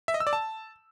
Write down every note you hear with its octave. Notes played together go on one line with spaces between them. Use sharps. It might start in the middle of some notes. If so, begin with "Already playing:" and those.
E5
D#5
E6
D5
A5